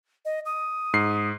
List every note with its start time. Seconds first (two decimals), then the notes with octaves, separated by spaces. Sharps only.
0.25 D#5
0.45 D#6
0.93 G#2 C7